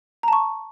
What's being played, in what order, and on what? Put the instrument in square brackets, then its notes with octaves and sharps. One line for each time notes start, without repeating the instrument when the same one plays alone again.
[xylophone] A#5
A5
C#6